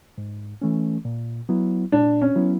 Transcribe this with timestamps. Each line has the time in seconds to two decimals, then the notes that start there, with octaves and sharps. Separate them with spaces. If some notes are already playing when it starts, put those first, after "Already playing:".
0.18 G#2
0.62 E3 A3 C#4
1.05 A#2
1.49 F#3 B3 E4
1.92 A#2 D4
2.22 C#4
2.36 F#3 B3 E4